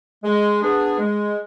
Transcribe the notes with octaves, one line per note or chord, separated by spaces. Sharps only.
G#3
B3 D4 G#4
G#3